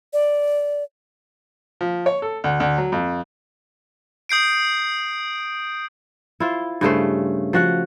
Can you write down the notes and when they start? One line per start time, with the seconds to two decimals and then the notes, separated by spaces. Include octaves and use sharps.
0.13 D5
1.81 F3
2.06 C#5
2.22 A4
2.44 D2
2.60 D2
2.78 F#3
2.92 F2
4.29 D#6 G6 C7 D7
6.40 E4 F4 C5
6.81 G2 C#3 A3 C5
7.53 F3 F#4 F#5